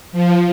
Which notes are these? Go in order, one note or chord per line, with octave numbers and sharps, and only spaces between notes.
F3